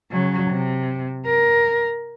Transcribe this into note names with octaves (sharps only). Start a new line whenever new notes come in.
C#3 F#3
C3
A#4